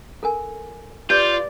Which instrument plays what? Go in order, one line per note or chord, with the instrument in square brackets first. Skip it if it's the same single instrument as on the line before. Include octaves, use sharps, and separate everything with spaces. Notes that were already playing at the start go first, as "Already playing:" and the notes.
[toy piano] A4 A#4 G#5
[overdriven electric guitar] F4 [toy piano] G4 B4 [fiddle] D5 [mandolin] G6